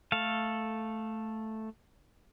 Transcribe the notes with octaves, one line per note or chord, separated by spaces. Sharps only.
A3 A4 F5